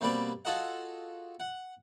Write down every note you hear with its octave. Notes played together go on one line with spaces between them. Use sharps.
B2 G3 A#3 C4 B4 D5
F4 F#4 G#4 A4 D#5 F#5
F#5